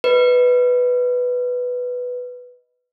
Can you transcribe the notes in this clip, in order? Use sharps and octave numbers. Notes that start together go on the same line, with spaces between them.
B4 D#5